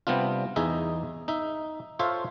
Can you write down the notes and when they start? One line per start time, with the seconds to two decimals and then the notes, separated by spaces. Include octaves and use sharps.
0.07 C3 G3 B3 D4 F4
0.56 E2 D#4 G#4 D#5 E5
1.28 D#4 E5
1.99 F4 A4 C5 C#5 E5 F5